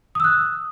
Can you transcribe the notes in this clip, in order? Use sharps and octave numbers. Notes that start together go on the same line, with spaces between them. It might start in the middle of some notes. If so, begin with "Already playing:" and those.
D#6 E6 F#6